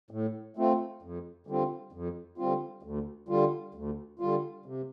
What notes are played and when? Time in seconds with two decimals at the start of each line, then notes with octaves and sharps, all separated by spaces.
0.11 A2
0.57 A3 C4 F4
1.02 F2
1.47 D3 G3 C4 F4
1.92 F2
2.38 D3 G3 C4 F4
2.83 D2
3.29 D3 G3 F4
3.75 D2
4.19 D3 G3 F4
4.66 C3